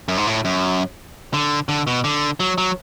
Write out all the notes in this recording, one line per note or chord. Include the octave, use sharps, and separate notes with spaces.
F#2
G#2
A2
F#2
D3
D3
B2
D3
F#3
F#3